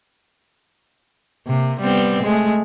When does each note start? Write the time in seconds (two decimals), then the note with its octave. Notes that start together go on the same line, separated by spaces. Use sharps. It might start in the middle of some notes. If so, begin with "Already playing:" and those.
1.47 C3 A#3
1.80 G3 B3 C4
2.23 G#3 A3